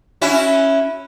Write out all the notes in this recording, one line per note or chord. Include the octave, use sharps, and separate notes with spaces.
C#4 E4 F#4